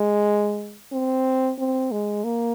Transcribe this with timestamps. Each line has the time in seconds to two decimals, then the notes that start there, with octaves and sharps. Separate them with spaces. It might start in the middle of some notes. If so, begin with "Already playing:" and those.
Already playing: G#3
0.92 C4
1.59 C4
1.92 G#3
2.24 A#3